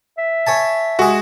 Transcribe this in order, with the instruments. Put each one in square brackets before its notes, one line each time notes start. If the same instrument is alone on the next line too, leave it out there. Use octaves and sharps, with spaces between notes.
[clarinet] E5
[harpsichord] C#5 G#5 A5
[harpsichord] G#3 G#4 [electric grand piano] F#4